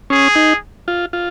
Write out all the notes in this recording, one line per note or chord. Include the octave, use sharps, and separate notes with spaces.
C#4 G#4
D#4
F4
F4